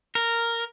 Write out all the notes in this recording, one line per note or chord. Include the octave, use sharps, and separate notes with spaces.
A#4